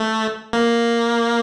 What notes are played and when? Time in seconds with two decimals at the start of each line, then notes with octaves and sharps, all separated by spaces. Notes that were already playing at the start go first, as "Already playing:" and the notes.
Already playing: A3
0.53 A#3